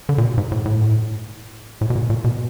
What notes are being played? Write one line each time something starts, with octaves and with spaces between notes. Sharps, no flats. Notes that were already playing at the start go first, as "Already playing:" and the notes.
D3
A#2
B2
G#2
A2
A2
A2
B2
A#2
A#2
B2